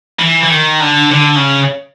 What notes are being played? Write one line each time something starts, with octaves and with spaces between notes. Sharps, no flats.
E3
E3
D#3
D3
D3
C#3